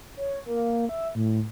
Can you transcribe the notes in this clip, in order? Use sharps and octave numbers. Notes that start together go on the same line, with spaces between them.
C#5
A#3
E5
A2